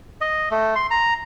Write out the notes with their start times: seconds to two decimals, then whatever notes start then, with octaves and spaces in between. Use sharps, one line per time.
0.21 D#5
0.51 A3
0.76 C6
0.91 A#5